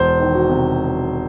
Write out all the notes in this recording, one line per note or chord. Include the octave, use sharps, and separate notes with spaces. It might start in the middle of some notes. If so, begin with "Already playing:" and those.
Already playing: E1 C5
D#3
F#4
C3